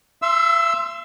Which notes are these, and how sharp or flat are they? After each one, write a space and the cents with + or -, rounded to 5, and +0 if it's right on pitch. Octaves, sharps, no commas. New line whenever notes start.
E5 +40 C6 +0 E6 +0